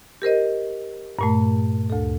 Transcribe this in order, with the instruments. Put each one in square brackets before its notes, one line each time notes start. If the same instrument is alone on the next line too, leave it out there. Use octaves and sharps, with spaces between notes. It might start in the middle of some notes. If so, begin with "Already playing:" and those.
[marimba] G4 A#4 C5 D#5
G2 A#2 A3
D2 A4